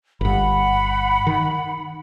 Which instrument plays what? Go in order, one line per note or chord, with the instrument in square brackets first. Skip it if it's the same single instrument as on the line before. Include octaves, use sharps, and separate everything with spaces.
[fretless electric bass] G1 G2 [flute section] F#5 B5
[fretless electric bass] D#3